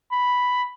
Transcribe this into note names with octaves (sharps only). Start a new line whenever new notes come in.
B5